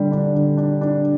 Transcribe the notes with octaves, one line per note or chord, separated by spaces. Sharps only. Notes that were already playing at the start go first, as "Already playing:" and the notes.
Already playing: D3 G3
D4
D3
D4
D4